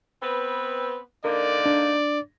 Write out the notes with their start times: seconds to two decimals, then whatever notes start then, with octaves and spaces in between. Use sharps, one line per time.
0.23 B3 C4 B4
1.25 D3 A#3 D#4 A#4 D5
1.66 D4